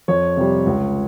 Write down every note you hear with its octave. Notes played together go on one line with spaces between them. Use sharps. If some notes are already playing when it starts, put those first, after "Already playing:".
F2 C#5
C3 G3
C#2